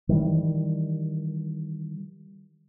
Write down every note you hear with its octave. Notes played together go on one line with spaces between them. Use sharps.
D#3 E3 G3